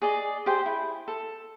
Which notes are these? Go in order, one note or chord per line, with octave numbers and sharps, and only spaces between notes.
G#4 D5 D#5
G4 G#4 C5 G5
E4
A4